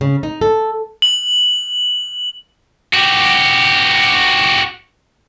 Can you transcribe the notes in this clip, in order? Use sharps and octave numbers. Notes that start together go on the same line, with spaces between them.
C#3
D#4
A4
F#7
F#4 G4